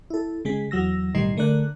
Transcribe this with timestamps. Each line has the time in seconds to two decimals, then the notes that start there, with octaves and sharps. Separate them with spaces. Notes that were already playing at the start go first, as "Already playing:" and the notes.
0.10 E4 A4
0.45 C#3 G#3 G#4 B6
0.71 E2 F#3 E6 A#6
1.15 B1 A2 D#3 G3 D#4 C7
1.37 D3 A3 A#4 D5 F#6